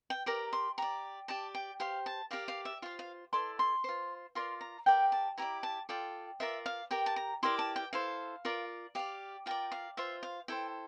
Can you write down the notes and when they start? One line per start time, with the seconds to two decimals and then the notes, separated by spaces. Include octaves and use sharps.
0.10 G5
0.26 G4 A#4 D5 A#5
0.53 C6
0.78 G4 D5 A#5
1.28 G4 D5 A5
1.55 G5
1.80 G4 C5 F5
2.06 A5
2.31 G4 A#4 D5 F5
2.48 F5
2.65 E5
2.82 F4 C5 F5
2.99 F5
3.33 E4 A4 D5 C6
3.59 C6
3.84 F4 C5
4.35 F4 A#4 D5 C6
4.61 A#5
4.86 G4 A#4 D5 G5
5.12 A5
5.38 E4 G4 D5 A#5
5.63 A5
5.89 F4 A4 D5 G5
6.40 F4 A#4 D5 E5
6.66 F5
6.91 G4 A#4 D5 G5
7.06 A5
7.16 A#5
7.43 E4 G4 A#4 D5 C6
7.59 A5
7.76 G5
7.93 E4 A4 C5 F5
8.45 F4 A#4 D5
8.95 G4 D5 F5
9.46 F4 A#4 D5 G5
9.72 F5
9.97 F4 C5 E5
10.23 F5
10.48 E4 A4 C5 G5